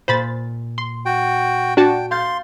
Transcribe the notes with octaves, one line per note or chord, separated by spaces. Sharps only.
A#2 C5 B5 A6
C6
F#4 G5
D4 F#4 G5 A5
F5 C6 G6 A6